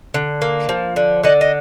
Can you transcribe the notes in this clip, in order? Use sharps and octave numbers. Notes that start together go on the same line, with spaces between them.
D3
A#3
F3
D3
D3 D#5 F#5
D#5